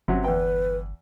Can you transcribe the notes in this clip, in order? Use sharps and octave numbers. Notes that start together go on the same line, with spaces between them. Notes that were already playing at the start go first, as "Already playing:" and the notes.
G1 C3 F#3 C#4
E2 B4 G5